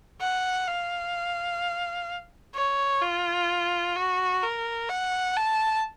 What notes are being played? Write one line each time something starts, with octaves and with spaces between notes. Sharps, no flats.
F#5
F5
C#5
F4
F#4
A#4
F#5
A5